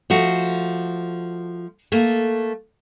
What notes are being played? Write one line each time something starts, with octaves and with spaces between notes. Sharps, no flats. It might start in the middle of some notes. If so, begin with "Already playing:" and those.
F3 A3 F#4
A3 A#3